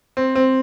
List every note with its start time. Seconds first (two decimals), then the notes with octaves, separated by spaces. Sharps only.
0.17 C4
0.35 C4